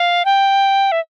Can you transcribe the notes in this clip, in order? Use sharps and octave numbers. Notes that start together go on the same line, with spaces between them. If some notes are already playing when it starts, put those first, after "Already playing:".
Already playing: F5
G5
E5